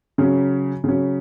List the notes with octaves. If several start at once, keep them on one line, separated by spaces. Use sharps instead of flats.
C#3 F#3 C#4
C#3 F#3 C#4